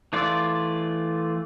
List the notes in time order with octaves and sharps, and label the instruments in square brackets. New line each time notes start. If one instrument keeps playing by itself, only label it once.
[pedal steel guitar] E3 A3 F4 D5